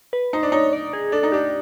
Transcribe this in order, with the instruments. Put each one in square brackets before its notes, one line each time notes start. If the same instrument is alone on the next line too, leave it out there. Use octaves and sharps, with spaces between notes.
[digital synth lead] B4
[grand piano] D#4 [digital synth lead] C5
[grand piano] D4
[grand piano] D#4 [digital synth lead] C#5
[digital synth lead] D5
G#4
[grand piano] D4 [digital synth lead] A4
[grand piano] D#4
[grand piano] D4 [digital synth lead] G4